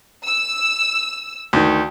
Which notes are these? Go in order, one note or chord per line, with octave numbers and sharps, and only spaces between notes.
E6
D2 D#3